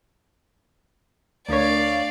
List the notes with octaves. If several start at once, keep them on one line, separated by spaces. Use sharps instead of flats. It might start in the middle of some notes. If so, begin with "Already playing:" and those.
D2 A3 D4 A#4 C#5 D5 F5